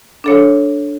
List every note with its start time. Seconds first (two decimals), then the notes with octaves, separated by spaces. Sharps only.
0.24 D4 A4 C#5